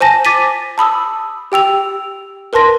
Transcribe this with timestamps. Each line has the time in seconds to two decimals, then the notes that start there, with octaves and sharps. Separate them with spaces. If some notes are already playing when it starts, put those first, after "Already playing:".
0.01 C5 G#5 A5 A#6
0.25 D6 A6 B6 D#7
0.78 A5 B5 D#6 E6
1.52 G4 G5 E6 F7
2.53 A#4 B4 A5 C6 A#6